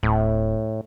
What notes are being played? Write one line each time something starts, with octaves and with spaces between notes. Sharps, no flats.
D1 A2